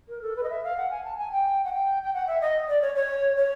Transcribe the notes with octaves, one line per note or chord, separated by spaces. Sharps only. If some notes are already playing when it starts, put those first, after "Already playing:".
A#4
A4
B4
D#5
E5
F5
F#5
G#5
A5
G#5
G5
F#5
G5
G5
F#5
E5
D#5
D5
C#5
C#5
C#5